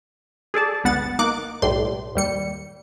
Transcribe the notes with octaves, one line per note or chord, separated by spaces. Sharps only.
G#4 A4 D5 A5
G1 C#2 B3 F#5 A6
A#3 D#4 D6 F#6
B1 A2 G3 C6
D#2 G3 C#7